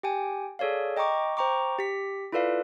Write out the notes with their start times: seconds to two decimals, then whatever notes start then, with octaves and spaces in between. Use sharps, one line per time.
0.03 G4 G5 G#5
0.59 G#4 A4 C#5 D5 F5
0.97 D#5 G5 A#5 C#6 D6
1.37 C5 G5 A#5 C#6 D6
1.79 G4 B6
2.32 E4 F4 A4 B4 D5 F5